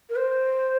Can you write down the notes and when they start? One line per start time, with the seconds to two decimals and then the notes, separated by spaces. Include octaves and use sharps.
0.09 A#4
0.16 C5